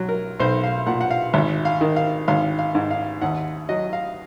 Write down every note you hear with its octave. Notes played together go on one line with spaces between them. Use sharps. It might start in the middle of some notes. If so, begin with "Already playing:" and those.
Already playing: B1 F#3
A#4
B1 C5
F5
A#2 F#5
F#5
F5
G#1 E5
F5
D#3
F5
G#1 F5
F5
G#2
F5
D#2 F#5
F#3 D#5
F5